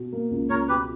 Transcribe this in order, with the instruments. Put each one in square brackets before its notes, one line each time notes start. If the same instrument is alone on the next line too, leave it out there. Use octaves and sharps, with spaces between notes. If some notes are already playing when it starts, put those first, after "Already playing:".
Already playing: [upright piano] B2
A#3
C#2
[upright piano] C#2 [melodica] A#4 C#5
[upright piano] B2 [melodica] G4 B4